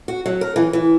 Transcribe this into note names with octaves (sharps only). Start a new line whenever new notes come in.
F#4
F#3
A#4
E3
E3